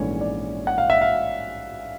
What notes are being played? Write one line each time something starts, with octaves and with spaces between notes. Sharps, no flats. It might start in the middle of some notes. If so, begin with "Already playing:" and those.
Already playing: A#1 G#2 E3 A3 C#4 C#5
D5
F#5
F5
E5
F5